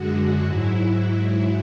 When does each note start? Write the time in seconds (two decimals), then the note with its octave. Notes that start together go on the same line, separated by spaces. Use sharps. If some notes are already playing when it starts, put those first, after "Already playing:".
Already playing: F#2 D3 G#3 F#4
0.45 G#2 F#3 E4